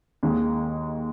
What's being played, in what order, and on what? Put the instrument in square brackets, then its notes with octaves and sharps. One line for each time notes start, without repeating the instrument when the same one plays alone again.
[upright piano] D#2 D#3 G#3